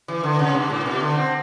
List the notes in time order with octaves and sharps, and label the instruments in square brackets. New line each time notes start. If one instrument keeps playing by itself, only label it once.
[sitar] E3
D3
C3
G2
A2
B2
D3
C4